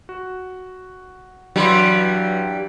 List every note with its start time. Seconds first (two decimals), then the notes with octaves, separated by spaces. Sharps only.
0.09 F#4
1.56 G2 E3 F#3 G3 B5 C6